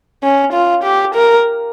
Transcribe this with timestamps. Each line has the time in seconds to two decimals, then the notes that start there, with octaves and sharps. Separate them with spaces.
0.23 C#4
0.53 F4
0.84 G4
1.15 A#4